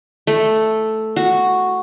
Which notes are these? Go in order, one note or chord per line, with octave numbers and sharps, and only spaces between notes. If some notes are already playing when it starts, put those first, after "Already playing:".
A3
F#4